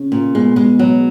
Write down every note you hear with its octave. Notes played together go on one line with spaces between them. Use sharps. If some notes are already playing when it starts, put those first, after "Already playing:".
Already playing: C#3
A#2
B2 G#3
G#3
F#3